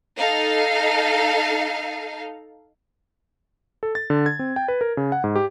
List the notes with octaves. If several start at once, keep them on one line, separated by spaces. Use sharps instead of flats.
D#4 A4 F5
A4
A6
D3
G#6
C4
G5
B4
A#4
C#3
F#5
G#2
G4